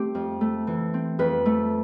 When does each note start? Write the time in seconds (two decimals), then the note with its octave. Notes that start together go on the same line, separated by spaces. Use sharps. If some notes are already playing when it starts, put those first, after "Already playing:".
Already playing: A3 C4 G4
0.15 F2
0.41 A3
0.67 E3
0.94 C4
1.19 F2 B4
1.46 A3